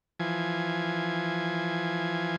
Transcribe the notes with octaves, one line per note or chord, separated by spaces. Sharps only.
E3 F3 G#5